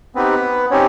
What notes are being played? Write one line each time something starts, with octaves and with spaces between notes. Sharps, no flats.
B3 C4 D#4 G4 B4
C4 C#4 D#4 G4 C#5